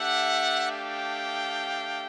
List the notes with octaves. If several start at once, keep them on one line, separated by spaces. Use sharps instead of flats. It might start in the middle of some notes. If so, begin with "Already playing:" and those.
Already playing: A3 D4 G4 E5 F#5
F5 G5